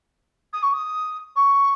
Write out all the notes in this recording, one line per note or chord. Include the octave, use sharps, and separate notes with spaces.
D#6
C#6
D#6
C#6